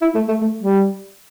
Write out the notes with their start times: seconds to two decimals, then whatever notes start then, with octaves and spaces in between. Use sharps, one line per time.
0.01 E4
0.15 A3
0.28 A3
0.41 A3
0.62 G3